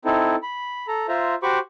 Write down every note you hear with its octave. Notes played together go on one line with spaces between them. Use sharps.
C4 D#4 E4 A4
B5
A4 A#5
F4 C5 E5 A#5
F#4 G4 C5 B5 C#6 D6